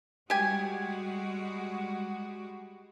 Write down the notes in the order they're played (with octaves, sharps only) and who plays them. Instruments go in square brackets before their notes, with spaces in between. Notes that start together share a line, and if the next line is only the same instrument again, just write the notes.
[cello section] G3 G#3 F#4 [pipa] G4 G#5